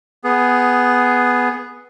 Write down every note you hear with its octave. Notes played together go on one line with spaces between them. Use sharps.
B3 G#4